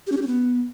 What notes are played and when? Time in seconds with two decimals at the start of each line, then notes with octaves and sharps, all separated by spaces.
0.07 G4
0.12 C#4
0.17 G4
0.22 C#4
0.27 B3